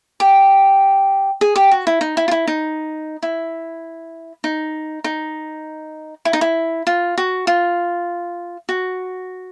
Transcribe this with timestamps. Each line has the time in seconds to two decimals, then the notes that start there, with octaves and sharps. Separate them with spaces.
0.20 G4
1.41 G#4
1.56 G4
1.71 F#4
1.87 E4
2.01 D#4
2.17 E4
2.28 F4
2.31 E4
2.47 D#4
3.23 E4
4.44 D#4
5.04 D#4
6.25 E4
6.33 D#4
6.41 E4
6.87 F4
7.18 F#4
7.47 F4
8.69 F#4